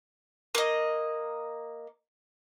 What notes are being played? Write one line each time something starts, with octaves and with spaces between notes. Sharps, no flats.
A#3 D#5